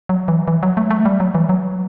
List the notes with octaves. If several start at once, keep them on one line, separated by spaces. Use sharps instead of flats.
F#3
E3
E3
F#3
A3
A3
G3
F#3
E3
F#3